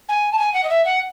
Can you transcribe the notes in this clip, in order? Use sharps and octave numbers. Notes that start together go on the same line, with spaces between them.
G#5
A5
G#5
F#5
D#5
E5
F#5